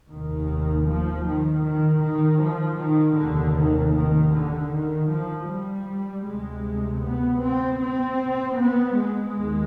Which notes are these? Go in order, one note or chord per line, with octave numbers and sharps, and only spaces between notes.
F1 D#2 D#3
F3
D#3
D#3
D#3
F3
D#3
F1 D#2 D3
D#3
D#3
D3
D#3
F3
G3
D2 C3 G#3
B3
C4
C4
B3
G#3
D#2